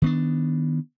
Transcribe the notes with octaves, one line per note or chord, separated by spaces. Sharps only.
D#3 B3 D4